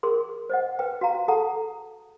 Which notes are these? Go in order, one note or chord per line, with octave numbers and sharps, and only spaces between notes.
G#4 A#4 C6
C5 D#5 F#5
B4 G5
F#4 F5 A#5
G#4 A4 F#5 A5 A#5